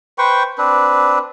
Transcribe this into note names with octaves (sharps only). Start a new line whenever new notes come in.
B4 C5 G5 C#6
C4 D4 B4